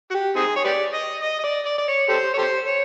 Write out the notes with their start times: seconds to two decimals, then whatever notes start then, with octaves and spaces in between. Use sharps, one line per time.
0.11 F#4
0.14 G4
0.36 C4 D#4 G#4
0.56 C#5
0.65 G4 B4 D5
0.94 D#5
1.22 D#5
1.39 D#5
1.44 D5
1.66 D5
1.78 D5
1.88 C#5
2.09 G4 A4 C5
2.34 C#5
2.38 G4 A4 C5
2.67 C#5